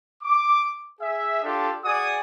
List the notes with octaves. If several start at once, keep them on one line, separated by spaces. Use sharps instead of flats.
D6
G#4 E5
D4 F4 G4 A4 D5
F#4 G#4 D5 G#5 D#6